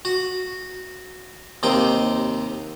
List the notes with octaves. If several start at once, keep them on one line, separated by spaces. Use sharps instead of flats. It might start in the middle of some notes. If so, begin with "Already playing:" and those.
F#4
D#2 C3 D#4 G5